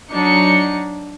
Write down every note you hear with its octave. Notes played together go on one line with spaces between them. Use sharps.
F#3 D4 D#4 C#7